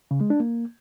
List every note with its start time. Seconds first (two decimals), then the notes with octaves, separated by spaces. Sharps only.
0.11 C#3
0.21 G#3
0.30 D4
0.40 A#3